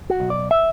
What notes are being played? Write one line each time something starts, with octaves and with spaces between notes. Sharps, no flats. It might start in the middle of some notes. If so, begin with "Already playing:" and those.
F#4
B1
D5
E5